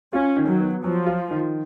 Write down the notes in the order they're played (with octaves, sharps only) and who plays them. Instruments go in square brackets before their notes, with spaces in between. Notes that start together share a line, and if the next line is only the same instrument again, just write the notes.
[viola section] C#4 [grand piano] F4
[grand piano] D#3
[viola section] F#3
[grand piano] B3
[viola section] F3 [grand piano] F#3
[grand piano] F4
D#3